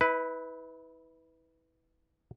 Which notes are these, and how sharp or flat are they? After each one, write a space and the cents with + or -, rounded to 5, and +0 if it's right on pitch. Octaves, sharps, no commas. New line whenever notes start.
E4 -35 B4 +0